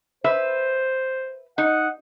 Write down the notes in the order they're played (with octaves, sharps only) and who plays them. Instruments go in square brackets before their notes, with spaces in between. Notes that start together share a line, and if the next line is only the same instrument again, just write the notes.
[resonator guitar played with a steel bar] B4 E5 [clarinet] C5
[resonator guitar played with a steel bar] D#4 [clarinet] F#5